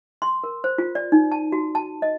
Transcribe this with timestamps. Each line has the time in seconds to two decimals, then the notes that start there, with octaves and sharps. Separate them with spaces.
0.22 C6
0.44 A#4
0.64 C5
0.78 F4
0.95 D5
1.12 D#4
1.32 A5
1.52 F#4
1.75 A5
2.02 D#5